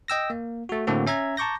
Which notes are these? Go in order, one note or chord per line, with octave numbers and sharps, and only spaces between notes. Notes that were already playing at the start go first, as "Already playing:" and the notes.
D#5 G5 E6 A#6
A#3
A3 F#4
A2 D3 A#3 C4 F#4
C#4 E5 A#5 G#6
A5 A#5 C#6 D6 G6 A#6